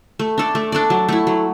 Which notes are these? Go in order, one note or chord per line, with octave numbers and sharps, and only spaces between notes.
A3
D4 A4 D5
A3
D4 A4 D5
F#3
A3 E4
F#3